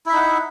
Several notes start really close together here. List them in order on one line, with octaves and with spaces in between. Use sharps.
E4 E5 D#4 F#5